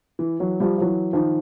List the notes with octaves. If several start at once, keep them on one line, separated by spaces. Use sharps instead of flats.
E3
E3 F#3
F3 G3
F3
E3 F#3
D#3 F3